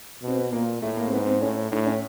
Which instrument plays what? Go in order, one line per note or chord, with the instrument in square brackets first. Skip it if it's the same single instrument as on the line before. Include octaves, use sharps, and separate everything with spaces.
[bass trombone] B2
[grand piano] C4
B3
[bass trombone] A#2 [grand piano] A#3
[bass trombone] A2 [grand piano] A3
[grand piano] A#3
C4
[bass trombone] G#2 [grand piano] B3
[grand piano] C4
[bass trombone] A2 [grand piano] C#4
[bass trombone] A2 [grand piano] D4
[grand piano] C#4